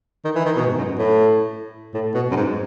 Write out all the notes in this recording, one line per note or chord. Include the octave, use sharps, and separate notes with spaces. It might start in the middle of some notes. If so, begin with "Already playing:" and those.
D#3
E3
D#3
B2
G#2
F#2
A2
A2
B2
F#2
G#2